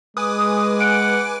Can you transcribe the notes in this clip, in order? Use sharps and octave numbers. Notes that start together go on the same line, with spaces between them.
G#3 B4 G#5 D6 D#6
F#5 D7